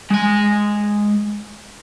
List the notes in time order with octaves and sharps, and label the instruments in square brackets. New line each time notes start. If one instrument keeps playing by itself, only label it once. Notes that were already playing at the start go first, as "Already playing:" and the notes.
[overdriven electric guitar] G#3 G#5